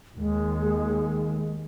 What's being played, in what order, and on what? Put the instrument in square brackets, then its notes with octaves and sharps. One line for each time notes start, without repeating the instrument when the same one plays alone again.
[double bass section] D#2 D#3 [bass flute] G#3